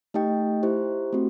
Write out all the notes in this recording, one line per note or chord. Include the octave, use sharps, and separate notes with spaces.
A3 D#4 G4 D#5 G5
E4 G4 C5
A3 C4 F#4